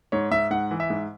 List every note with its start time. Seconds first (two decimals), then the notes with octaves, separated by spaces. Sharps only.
0.12 G#2 C#5
0.31 G#2 E5
0.50 G#2 F#5
0.71 E3
0.80 E5
0.90 G#2